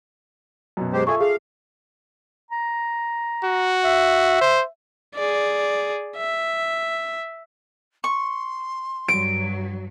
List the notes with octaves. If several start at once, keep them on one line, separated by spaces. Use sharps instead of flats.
F#2 B2
G#3 G4 C5
F4 G#4 A4 E5 C#6
G#4 F5
A#5
F#4
E5
C5
G#4 D5
E5
C6 C#6
G2 F#3 D7